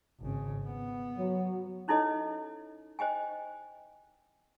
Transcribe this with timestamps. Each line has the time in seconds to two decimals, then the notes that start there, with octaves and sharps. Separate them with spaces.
0.20 G#1 C#3
0.66 B3
1.16 F#3
1.88 C#4 D#4 E4 A4 C#5 D#5
2.99 C5 D#5 G5 G#5